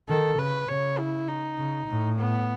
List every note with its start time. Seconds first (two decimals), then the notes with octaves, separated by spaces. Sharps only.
0.09 D#3 A4
0.38 C#3 B4
0.68 C#3 C#5
0.98 E4
1.28 D#4
1.58 C#3
1.88 A2
2.18 B3